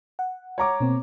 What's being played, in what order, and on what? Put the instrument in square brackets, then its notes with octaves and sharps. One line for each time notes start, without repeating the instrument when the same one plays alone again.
[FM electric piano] F#5
[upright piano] C#5 A#5 D6
[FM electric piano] B2 A#3 C4